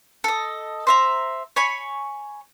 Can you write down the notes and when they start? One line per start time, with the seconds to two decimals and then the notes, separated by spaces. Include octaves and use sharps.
0.24 A4 D#5
0.87 C5 E5 A#5
1.56 C#5 G#5 B5 C#6